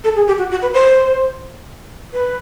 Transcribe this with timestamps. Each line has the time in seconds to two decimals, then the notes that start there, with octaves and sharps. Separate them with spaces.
0.04 A4
0.16 G#4
0.27 G4
0.38 F#4
0.51 F#4
0.62 B4
0.74 C5
2.13 B4